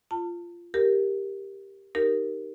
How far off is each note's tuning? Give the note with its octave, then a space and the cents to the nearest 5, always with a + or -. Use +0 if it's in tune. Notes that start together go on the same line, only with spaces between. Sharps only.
F4 -15 A5 +35
G4 +5 A#4 +0
D#4 +0 G4 +0 A#4 +0